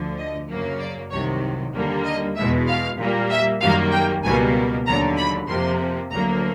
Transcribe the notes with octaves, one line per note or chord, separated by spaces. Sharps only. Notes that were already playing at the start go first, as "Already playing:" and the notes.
Already playing: D2 D3 F3
D#5
F#2 C#3 F#3 A#3
D5
C2 C3 D#3 F#3 C#5
D#2 D3 G3 A#3
D#5
E2 B2 G#3 E5
F5
A#2 G3 A#3
E5
F#2 D#3 G3 A#3 F5
G5
C#2 B2 G3 A#3 G#5
D#2 D3 F#3 A#5
B5
F2 C3 F3 A#3 C6
D2 D3 F#3 A#3 A#5